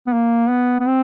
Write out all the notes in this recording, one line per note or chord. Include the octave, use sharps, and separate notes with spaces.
B3
A#3
B3
B3
C4